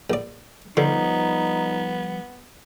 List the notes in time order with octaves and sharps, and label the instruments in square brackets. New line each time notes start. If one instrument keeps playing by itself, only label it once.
[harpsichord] A#1 D5
[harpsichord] D3 [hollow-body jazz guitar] F3 G3 [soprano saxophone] B3 [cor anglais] D#4